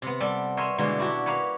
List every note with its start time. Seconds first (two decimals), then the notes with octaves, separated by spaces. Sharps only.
0.02 C3 B3
0.20 G3 A4 D5
0.57 A#4 C5 C#5 D#5 E5
0.78 B2 D3 E3 G3 G#3 A#3
0.99 D4 E4 F#4 G4
1.26 A#3 B4 C#5